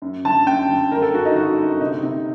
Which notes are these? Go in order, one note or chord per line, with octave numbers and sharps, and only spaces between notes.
F#2
G1 A5
F#2 G5
G1
G1 A#4
A4
G2 F#4
D#4
G1 F#4
G1
C3 D#4
C3